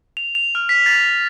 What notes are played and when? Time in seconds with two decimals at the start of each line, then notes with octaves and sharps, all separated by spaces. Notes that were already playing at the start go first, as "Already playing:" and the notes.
0.17 F7
0.35 F7
0.55 F6
0.69 B6
0.86 A6